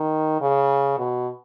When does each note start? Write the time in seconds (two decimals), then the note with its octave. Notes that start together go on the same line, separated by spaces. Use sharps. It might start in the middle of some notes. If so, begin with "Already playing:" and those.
Already playing: D#3
0.41 C#3
0.98 B2